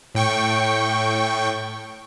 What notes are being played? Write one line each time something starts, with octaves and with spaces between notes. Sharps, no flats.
A2 G5 C#6